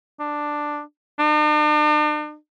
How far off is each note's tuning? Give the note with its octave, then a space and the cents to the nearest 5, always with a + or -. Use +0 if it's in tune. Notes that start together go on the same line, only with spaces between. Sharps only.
D4 +10
D4 +45